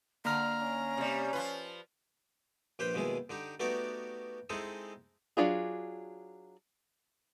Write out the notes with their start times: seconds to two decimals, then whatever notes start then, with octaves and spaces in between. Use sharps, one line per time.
0.25 D3 A#3 A#5 F6
0.61 C#4
0.97 C3 G3
1.33 F3 F4 B4
2.79 A#1 G4 B4 C5 G5
2.94 D#2 B2 G#3 E4 G#4
3.30 D3 D#4 G4
3.60 A3 B3 D#4 F#4 G4 D5
4.50 G#3 C4 D#4 E4 G#4 A4
5.37 F#3 A3 D4 F4 G#4